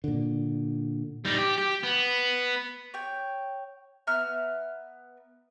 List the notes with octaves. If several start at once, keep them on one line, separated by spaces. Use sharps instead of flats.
A#2 D3
G3 D#4
G4
G4
B3
C#5 G5
B3 E5 A#5 F6